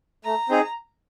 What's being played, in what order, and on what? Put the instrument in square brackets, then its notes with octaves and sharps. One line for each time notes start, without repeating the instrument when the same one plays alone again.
[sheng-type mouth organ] A3 [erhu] A#5
[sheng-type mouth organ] C4 D#4 G#4